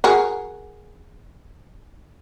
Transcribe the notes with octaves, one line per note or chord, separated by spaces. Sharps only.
F#4 G#4 A#4